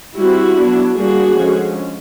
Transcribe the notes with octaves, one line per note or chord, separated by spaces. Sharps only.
G3 C4 E4 F#4
F#3 B3 D4
G3 A#3 D4 F#4 G#4
D3 F3 G#3 C#4